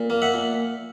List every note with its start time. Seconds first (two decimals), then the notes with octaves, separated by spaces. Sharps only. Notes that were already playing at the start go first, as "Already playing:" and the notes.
Already playing: A#2
0.10 A#3
0.22 E5 F#5
0.34 A#2